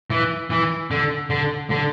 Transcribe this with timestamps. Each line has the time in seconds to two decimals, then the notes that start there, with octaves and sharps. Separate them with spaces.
0.10 E3
0.50 E3
0.91 D3
1.30 D3
1.70 D3